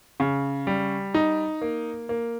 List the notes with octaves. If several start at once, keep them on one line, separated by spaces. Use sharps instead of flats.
C#3
G3
D#4
A#3
A#3